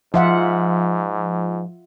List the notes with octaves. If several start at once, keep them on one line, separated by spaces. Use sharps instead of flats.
G#2 F3 F4 E5 F#5